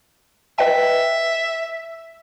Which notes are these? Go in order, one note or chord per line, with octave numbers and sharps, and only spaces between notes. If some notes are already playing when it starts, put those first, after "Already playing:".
B4 D#5 E5 G5